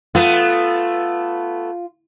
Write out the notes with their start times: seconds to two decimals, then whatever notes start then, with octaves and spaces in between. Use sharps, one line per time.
0.15 A3 B3 F4